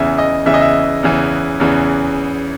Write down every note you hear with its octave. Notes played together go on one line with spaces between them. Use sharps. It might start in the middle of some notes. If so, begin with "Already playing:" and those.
Already playing: E2 C#3 E3 E5
D#5
E2 C#3 E3 E5
D#5
E5
E2 C#3 E3
E2 C#3 E3